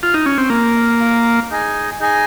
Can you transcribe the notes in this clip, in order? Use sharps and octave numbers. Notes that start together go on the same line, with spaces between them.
F4
D#4
C#4
C4
A#3 F4 A#4 F5
F4 A#4 F5
D#4 G#4 D#5 G#5
D#4 G#4 D#5 G#5